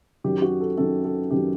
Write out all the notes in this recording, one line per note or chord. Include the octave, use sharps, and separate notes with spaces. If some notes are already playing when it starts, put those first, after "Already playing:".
F#2 D#3 F#3 G4
F#4
A4
F#2 D#3 F#3 A4
A4
F#2 D#3 F#3 G4